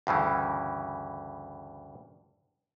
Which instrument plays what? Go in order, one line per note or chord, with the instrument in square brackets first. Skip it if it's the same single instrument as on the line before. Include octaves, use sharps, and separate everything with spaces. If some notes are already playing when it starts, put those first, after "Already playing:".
[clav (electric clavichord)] D2 G2 C#3 E3